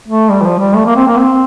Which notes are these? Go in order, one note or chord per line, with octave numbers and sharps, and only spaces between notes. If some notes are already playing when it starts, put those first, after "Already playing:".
A3
G3
E3
F3
G3
A3
A#3
C4
A#3
C4